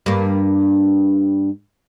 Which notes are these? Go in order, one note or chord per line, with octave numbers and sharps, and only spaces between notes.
G2 A#3